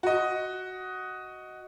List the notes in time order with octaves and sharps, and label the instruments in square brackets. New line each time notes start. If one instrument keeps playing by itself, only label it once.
[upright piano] F#4 D#5